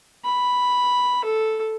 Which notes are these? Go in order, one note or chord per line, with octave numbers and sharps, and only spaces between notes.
B5
A4